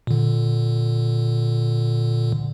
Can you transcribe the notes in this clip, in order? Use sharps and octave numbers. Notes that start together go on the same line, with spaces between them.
A#2 D3